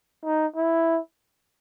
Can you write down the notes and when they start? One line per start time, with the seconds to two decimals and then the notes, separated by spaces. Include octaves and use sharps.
0.25 D#4
0.56 E4